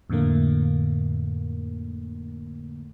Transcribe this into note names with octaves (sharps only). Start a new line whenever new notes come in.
F2 A2 D3 A3 A#3